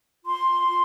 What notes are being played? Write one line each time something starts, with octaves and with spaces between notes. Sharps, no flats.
F4 C6
F4